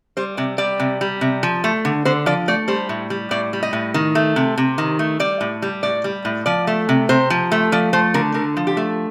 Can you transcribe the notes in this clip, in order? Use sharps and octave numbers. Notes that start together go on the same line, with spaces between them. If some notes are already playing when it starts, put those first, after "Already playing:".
G3 C5
C3 D5
G3 D5
C3
G3
C3
F3
A3
D3
D3 C5
F3 D5
A3 D5
G3 C5
A2
G3
A2 D5
G3
D#5
A2
D#3
A3
C3
C3
D#3
A3
G3 D5
A2
G3
A2 D5
G3
A2
F3 D5
A3
C3
C3 C5
F3
A3
F3 D5
A3 C5
D3 A#4
D3 A#4
F3
G4
A3